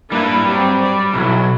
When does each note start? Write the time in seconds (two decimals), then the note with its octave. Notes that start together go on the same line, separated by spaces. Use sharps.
0.12 G3 A#3 D4 E4 B4
0.47 F#3 C4 G4
0.83 D5
1.14 B1 E3 F#3 E4